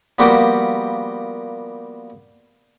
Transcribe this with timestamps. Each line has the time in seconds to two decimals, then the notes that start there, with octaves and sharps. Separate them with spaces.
0.19 F3 G3 A#3 B3 F#4 G4